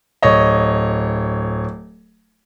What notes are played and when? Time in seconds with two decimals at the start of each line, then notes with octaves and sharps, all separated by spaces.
0.22 D1 C#5 D#5